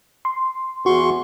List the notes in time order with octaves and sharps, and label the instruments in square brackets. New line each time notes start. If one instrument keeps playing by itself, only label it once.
[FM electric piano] C6
[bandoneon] E2 C6 C#6 [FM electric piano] F#4